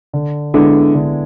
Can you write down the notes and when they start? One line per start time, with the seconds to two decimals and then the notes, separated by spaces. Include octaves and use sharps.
0.13 D3
0.54 D3 G#3 B3 E4
0.95 D3